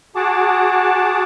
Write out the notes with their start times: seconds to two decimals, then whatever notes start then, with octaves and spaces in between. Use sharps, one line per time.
0.16 F#4 G#4 F#5 A5 D6